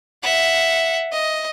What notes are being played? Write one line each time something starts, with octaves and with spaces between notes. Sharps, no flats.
E5 F#5
D#5